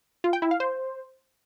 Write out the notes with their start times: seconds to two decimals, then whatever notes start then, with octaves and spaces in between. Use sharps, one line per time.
0.24 F4
0.33 G5
0.42 E4
0.51 F5
0.60 C5